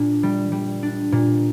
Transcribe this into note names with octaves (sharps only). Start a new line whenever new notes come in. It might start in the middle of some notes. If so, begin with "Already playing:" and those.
Already playing: A#2 D4
G3
G3
D4
A#2